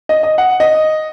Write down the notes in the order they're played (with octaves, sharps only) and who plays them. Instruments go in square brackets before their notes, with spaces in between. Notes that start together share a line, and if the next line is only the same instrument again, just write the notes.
[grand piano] D#5
D#5
F#5
D#5